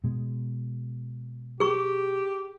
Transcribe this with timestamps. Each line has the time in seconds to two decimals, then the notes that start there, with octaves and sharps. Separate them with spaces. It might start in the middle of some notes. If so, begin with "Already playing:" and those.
0.04 B2 G#3
1.60 G4 G#4 C#6